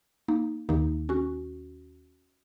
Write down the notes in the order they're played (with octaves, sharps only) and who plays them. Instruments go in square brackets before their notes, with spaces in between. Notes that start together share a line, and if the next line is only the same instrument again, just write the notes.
[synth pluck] A#3 D#4
D#2 D#3 A#3 D#4
C#4 F#4